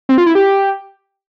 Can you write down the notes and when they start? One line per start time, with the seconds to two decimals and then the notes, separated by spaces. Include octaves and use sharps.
0.09 C4
0.18 F4
0.26 E4
0.35 G4